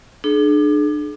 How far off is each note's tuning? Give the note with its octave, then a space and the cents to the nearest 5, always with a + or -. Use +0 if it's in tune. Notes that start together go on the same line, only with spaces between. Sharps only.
D4 +30 G#4 +35